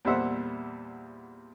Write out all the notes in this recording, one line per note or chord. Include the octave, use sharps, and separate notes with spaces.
E2 A#2 G3 C5 E5 F#5